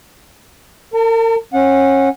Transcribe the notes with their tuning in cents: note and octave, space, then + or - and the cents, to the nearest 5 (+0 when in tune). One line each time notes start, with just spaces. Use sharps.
A#4 -40 A5 +30
C#4 -25 F#5 -20